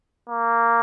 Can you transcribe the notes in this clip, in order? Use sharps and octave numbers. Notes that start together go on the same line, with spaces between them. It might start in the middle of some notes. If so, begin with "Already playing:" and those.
A#3